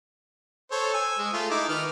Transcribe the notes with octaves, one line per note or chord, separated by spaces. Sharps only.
A4 C5 C#5
G#5 E6
G#3
A3 F4
D#4 E4 D6
D#3 B4 F6